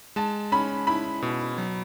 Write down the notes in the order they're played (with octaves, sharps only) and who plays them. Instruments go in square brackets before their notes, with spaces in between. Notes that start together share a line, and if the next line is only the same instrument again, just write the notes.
[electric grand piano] G#3 [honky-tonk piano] A5
[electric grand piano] C#4 [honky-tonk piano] B5
[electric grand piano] E4 [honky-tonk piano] B5
[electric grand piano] B2
F#3